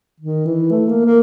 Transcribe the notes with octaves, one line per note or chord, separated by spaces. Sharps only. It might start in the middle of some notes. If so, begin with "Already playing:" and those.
D#3
E3
A3
A#3
A#3